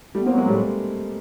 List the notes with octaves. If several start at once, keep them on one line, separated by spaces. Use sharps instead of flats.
G3 A3 B3
A#3 C4
F#3
G#3 A#3
A2 G3 A3